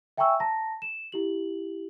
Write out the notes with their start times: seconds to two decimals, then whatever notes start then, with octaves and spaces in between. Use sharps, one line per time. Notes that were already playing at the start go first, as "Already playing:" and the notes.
0.18 E5 G5 G#5 A#5 C#6 E6
0.40 A5 A#5 A#6
0.82 E7
1.12 E4 G4 F#7